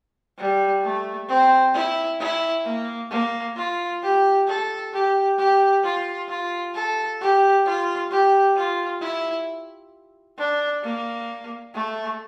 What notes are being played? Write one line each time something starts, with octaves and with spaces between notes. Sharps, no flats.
G3
A3
C4
E4
E4
A#3
A#3
F4
G4
A4
G4
G4
F4
F4
A4
G4
F4
G4
F4
E4
D4
A#3
A3